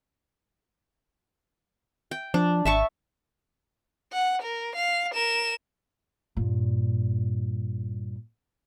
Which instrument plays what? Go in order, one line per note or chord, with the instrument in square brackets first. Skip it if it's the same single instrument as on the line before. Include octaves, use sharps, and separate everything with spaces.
[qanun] G5
[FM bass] F3 [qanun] D4
[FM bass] G#1 [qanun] E5 A5 C#6
[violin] F#5
A#4
F5
A#4 E7
[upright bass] G2 A#2